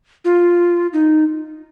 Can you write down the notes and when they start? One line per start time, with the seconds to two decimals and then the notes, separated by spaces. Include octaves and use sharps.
0.25 F4
0.93 D#4